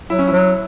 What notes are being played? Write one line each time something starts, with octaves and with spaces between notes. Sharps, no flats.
F#3 E4
C#4
F#3 E4